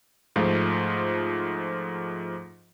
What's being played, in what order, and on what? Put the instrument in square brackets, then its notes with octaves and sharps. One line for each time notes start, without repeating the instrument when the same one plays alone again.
[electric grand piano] G#2 F3 A3 F4